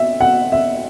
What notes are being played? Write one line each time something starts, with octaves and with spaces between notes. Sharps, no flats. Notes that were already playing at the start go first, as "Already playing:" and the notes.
Already playing: E5
F#5
E5